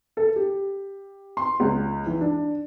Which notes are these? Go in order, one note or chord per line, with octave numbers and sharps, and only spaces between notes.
A4
G4
C6
C#2
E3
D4